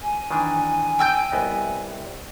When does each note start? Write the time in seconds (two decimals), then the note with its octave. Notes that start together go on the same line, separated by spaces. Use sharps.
0.01 G#5
0.31 D#3 E3 D4
0.99 G5 E6 G6
1.32 C2 B3 D#5